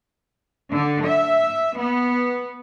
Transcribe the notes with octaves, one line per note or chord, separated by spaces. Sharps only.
D3
E5
B3